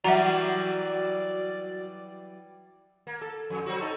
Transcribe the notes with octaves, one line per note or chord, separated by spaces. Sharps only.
E3 F#3 G3 F#4 D5 E5 F#5 A#5
A#3
A4
F2
F#3 C4 F#4
D#4 A4